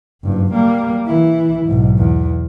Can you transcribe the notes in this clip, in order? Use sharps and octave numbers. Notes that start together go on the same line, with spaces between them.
F#1 G2
G3 A#3
E3 E4
B1 G#2
E2